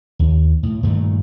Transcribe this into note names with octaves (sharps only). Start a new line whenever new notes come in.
D#2
A2
G2 A#2 D#3 A3